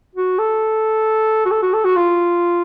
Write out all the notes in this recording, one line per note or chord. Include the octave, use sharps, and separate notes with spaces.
F#4
A4
F#4
A4
F#4
A4
F#4
F4